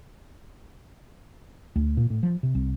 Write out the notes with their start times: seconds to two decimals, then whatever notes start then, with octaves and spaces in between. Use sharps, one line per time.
1.76 D2
1.97 A#2
2.10 A2
2.23 F3
2.43 C3
2.55 C2